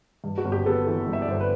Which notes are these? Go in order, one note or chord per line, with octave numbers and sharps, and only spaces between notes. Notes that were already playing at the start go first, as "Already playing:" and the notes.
G2
F#4
G1
G4
B3 A4
E3
G2
E5
D5
G1 C5
B4